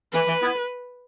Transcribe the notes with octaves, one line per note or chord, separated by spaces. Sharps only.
E3 B4
E3
B3 E4